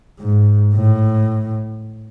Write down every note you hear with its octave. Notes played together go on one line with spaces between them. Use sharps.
G#2
A2